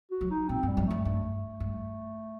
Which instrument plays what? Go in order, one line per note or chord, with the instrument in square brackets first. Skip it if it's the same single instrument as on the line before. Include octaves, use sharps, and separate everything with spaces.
[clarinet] F#4
[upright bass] F#3
[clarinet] D#4
[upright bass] A#2 [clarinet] C4
[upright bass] G2
[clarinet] G3
[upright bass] F#2
[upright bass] G2 [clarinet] A3
[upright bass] G2 [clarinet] A3
[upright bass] G2